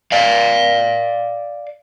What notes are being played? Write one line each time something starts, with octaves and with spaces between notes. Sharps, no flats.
D5 F5